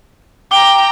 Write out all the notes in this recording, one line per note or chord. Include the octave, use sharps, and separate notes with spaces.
G5 A#5 D6 G7